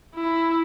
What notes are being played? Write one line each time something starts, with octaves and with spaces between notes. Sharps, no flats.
E4